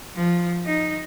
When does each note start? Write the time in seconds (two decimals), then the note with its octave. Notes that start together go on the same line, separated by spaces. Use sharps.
0.16 F3
0.66 D#4